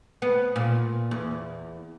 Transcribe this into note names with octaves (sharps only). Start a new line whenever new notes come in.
B3
A#2
E2